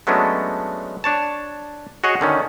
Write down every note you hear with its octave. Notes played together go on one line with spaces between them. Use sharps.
F#3 G#3 A3 B3 C#4 D4
D4 C#5 A5
F#4 G#4 C#5 D#5 F#5
D3 D#3 C#4